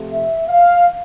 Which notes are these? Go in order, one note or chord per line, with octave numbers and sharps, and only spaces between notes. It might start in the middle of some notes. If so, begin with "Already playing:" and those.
Already playing: C3 F3 A3
E5
F5